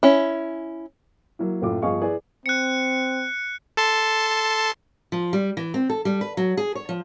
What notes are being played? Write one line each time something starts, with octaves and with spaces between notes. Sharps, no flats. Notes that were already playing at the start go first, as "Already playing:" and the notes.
C#4 E4
F#3 A#3 E4
F#1 A2 E4 F4 D6
G1 F3 G#4 D#5 F5 C#6
E4 G#4 B4 D5
C4 F#6 C#7
A4 A5 C6
F3
G3
E3
C4
A4
G3
B4
F#3
G#4
C#5
F3